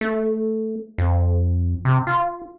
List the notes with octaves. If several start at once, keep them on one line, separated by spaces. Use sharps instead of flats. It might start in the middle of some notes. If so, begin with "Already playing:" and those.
A3
F2
C3
F4